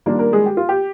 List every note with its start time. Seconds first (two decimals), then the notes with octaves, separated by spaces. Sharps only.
0.06 D#3 G3 A#3 D4 F4 A#4
0.19 A#3 A#4
0.33 G#3 G#4
0.46 G4
0.57 F4
0.69 G4